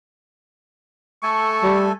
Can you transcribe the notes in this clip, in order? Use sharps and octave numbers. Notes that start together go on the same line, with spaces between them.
A3 A4 G#5 C#6
G3